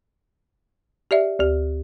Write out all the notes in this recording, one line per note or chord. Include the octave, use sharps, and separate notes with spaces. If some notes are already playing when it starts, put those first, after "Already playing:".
G4 D5 E5
D2 G4